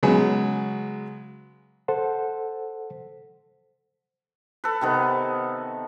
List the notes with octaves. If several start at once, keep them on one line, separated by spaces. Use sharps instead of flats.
C#3 F#3 G#3 B3
A4 C5 F#5
A4 B4
C3 D#3 B3